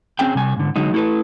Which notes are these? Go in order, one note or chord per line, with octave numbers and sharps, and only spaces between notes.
C4 C#4 G#4 G5
C3 G3 G#5
G#2 D3
D3 F#3 G#3 D#4
A3 E4 F#4 A4 B4